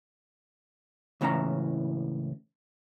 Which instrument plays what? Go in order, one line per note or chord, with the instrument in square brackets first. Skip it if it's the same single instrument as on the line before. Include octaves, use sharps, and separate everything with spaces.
[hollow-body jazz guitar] C#2 A2 E3 C#4 E5 A#5